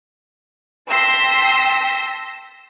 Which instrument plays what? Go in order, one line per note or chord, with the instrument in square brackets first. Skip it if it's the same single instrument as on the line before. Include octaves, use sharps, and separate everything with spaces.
[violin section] G5 A5 C6 E6 A#6 B6